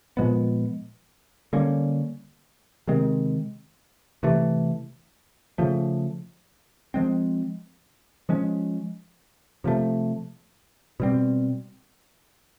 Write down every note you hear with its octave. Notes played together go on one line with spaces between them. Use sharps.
A#2 F3 G#3 B3
D3 G3 A#3 C#4
C3 D#3 G#3 C4
C3 E3 A3
C#3 F3 A3
F3 G#3 C4
F3 G#3 C#4
C3 F3 A3
B2 G3 C4